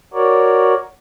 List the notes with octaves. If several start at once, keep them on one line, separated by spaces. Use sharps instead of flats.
F#4 A#4 C#5 D5